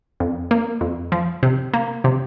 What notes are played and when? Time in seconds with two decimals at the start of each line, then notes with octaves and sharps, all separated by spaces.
0.20 F2
0.51 A#3
0.81 F2
1.12 F3
1.43 C3
1.74 A#3
2.04 C3